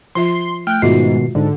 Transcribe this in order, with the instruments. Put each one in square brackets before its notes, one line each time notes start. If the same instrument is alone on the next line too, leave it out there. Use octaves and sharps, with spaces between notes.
[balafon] F3 F4 E5 [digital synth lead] C6
[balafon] A3 [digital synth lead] G5 [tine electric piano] F6 F#6
[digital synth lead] G#2 [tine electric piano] B2 D#3 C7 [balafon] F4 F#4 E5
[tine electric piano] G#2 [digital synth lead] D3